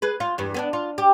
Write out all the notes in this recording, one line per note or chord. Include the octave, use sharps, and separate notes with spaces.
G#4 B4
F4
E2 G2
B3 C4 D4
F4
G4